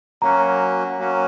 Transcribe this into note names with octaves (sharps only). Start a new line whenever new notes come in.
F#3 A#3 C#4 F#4 A#5
F#3 A#3 C#4 F#4